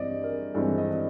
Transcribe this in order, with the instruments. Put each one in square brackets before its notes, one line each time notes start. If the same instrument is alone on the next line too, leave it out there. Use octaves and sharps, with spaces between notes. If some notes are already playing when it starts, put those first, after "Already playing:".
Already playing: [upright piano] G2 E3 G#3 C4 [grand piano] D5 D#5
[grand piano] A#4
[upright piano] G2 E3 G#3 C4 [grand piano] A4
[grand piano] D#5